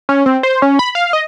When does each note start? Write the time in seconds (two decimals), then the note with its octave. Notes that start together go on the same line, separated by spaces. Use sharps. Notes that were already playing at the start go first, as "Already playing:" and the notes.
0.09 C#4
0.26 C4
0.43 C5
0.62 C#4
0.79 B5
0.95 F5
1.13 D#5